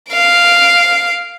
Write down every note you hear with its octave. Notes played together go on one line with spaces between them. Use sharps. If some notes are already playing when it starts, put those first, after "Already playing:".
F5 D7